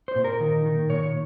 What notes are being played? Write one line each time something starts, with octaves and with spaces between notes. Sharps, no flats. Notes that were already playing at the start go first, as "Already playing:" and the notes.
C5
A#2
A#4
D#3
D#3
A#2 C#5